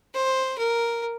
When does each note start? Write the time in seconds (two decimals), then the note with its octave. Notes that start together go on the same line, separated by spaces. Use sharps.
0.14 C5
0.58 A#4